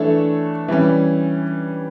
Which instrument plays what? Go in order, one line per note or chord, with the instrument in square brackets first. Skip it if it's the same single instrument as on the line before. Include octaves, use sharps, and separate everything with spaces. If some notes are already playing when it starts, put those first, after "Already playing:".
Already playing: [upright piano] E3 A3 D4 A4 C#5
E3 G3 C#4